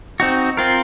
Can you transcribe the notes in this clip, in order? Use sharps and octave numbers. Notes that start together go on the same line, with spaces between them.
C4 D#4 F#4
C4 F4 A#4